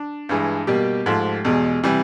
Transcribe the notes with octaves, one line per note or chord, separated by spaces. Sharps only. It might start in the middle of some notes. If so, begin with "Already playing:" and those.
Already playing: D4
G2 E3 G#3
B2 G3 A#3 G4
G#2 F3 A3
E2 B2 G#3
C3 E3 G3